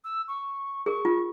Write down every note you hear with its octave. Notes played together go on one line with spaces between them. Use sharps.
E6
C#6
G#4 A#4 C#6
F4